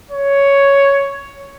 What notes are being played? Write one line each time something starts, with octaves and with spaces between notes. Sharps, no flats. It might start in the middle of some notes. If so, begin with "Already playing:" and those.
C#5